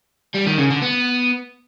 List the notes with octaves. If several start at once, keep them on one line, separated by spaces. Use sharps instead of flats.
G3
D#3
C#3
D3
B3